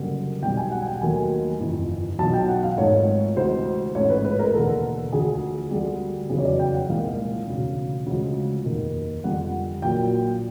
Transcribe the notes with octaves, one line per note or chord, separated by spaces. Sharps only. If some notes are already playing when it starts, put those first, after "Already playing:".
Already playing: F#1 F#2 D3 G3
B1 B2 G3 G5
G#5
F#5
G#5
G5
D#2 D#3 F#3 A3 G#5
G1 F2 C3 E3
B1 B2 F#3 A5
G5
F#5
F5
G#1 G#2 F3 A3 C#5
D2 C3 E3 G#3 C5
A1 G#2 F3 A3 C#5
B4
B4
A#4
E1 D#2 D3 A4
D2 D3 F3 G#4
D2 D3 G3 G#4
F1 E2 C#3 F#3 G#4
C#5
D5
G5
F#5
C2 A#2 F3 G#3 F5
E1 D2 C#3
D2 C#3 F3 G#3
F1 D#2 D#3
F2 D3 G3 F#5
A#1 A#2 F#3 G5